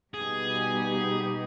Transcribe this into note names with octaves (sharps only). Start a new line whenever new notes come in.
B2 G3 B3 D#4 G4 G#4